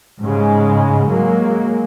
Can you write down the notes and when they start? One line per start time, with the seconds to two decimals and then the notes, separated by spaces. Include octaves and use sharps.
0.21 G#2 C#3 G#3
1.10 F#3 G#3 A#3